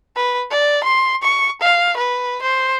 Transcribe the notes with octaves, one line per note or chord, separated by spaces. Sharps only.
B4
D5
C6
C#6
F5
B4
C5